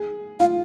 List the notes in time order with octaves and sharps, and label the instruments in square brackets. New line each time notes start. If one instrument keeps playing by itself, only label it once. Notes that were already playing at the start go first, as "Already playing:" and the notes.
Already playing: [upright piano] G#4
[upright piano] F4 [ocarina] F5